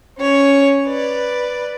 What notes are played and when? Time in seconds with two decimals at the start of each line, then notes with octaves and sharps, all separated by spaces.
0.19 C#4 C#5
0.87 B4 D5